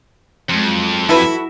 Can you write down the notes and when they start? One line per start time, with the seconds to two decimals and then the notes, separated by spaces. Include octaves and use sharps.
0.49 F2 F#3 G#3
1.09 E4 F#4 A4 B4